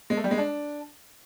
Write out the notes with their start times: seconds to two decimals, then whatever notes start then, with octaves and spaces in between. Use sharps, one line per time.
0.10 G#3
0.17 A3
0.24 G3
0.31 G#3
0.38 D4